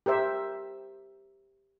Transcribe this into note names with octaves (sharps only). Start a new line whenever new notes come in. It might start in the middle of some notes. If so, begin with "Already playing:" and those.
G4 A#4 C5 E5